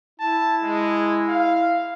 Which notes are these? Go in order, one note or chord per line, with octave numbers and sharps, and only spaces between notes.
E4 A5
G#3
F5